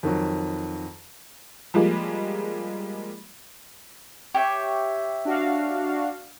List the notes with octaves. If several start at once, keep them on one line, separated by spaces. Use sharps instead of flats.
F2 D#3 F#3
F3 G3 G#3 A#3
G4 C#5 E5
D4 F#4 F5